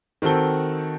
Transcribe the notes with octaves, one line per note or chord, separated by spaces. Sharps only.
D#3 C4 F#4 A4 G7